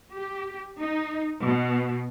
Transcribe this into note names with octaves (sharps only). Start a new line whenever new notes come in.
G4
D#4
B2